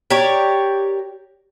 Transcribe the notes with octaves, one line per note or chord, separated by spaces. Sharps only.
G4 A#4 C#5 D5